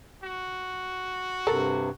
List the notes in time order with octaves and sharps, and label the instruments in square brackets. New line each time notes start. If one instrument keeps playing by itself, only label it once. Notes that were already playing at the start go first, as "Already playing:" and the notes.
[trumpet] F#4
[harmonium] G2 C3 [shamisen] A4 A#4